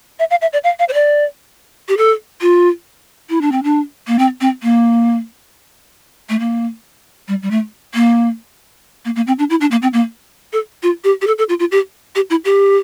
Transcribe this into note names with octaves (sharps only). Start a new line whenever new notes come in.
E5
F5
E5
D5
F5
F5
C5
D5
G4
A4
F4
E4
D4
C4
D4
A#3
C4
C4
A#3
A3
A#3
G3
G3
A3
A#3
A#3
A#3
C4
D4
E4
D4
A#3
C4
A#3
A4
F4
G4
G4
A4
A4
F4
F4
G4
G4
E4
G4